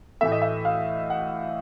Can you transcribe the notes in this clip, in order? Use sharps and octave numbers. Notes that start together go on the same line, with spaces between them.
A2 E3 A3 E5
D#5
E5
F5
F#5